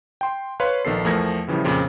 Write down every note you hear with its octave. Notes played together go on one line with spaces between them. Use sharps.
G5 C6
B4 C#5 F5 C6
A#1 D#3 B3 A4 C7
E2 F3 A3 A#4 G#6 A#6
A2 C#3 E3 F3 G3
F2 A#2 C#3 C4